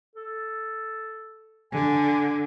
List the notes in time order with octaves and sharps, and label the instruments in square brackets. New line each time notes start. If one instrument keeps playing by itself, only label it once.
[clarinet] A4
[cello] D3 [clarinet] G#5